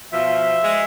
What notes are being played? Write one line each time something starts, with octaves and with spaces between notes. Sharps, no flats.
B2 F3 E5
G#3